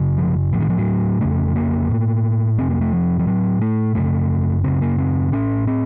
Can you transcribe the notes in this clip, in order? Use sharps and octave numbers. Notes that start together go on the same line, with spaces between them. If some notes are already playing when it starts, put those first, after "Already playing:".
Already playing: F#2 C#3
F3
A2 F3
D#3
F3
F#3
F2 C#3 A3
A#3
A2
F2 C3 C4
A#3
A3
F3
F3
A2 F#3
A3
F#2 C#3 A3
F#2 C#3 C4
A#3
C4
A2 C#4
C4